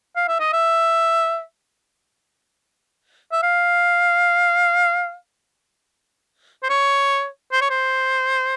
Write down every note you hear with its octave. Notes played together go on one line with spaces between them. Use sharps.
F5
E5
D#5
E5
E5
F5
C5
C#5
C5
C#5
C5